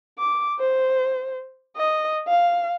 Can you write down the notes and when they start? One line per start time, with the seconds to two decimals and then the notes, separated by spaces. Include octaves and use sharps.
0.19 D6
0.60 C5
1.76 D#5
2.28 F5